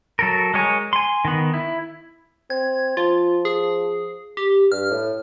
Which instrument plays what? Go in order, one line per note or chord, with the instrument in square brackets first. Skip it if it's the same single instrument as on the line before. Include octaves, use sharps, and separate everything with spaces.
[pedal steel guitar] F#3 A4 A#4
G#3 A#4 C#5 G#5
G#5 C6
D#3 B3
E4
[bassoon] C4 [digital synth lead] G#6
[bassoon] F3 [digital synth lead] F4
[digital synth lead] G#4
G4
[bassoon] G2 [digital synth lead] F6
[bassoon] A2